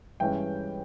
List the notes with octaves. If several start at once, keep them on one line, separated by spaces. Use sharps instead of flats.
G2 E3 G#3 C#4 G5